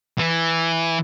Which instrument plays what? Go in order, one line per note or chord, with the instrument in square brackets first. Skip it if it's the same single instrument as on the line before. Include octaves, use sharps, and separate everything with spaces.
[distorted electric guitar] E3